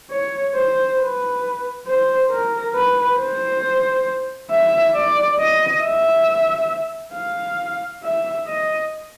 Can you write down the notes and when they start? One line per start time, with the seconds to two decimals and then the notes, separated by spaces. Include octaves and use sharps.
0.10 C#5
0.55 C5
0.99 B4
1.87 C5
2.31 A#4
2.75 B4
3.18 C5
4.51 E5
4.95 D5
5.39 D#5
5.83 E5
7.14 F5
8.04 E5
8.47 D#5